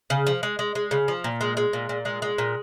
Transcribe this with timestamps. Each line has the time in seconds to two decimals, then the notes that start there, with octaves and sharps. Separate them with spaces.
0.10 C#3
0.27 F3
0.43 G#3
0.59 G#3
0.75 G#3
0.91 C#3
1.08 F3
1.24 A#2
1.41 G#3
1.57 G#3
1.73 A#2
1.89 A#2
2.05 G#3
2.22 G#3
2.38 A#2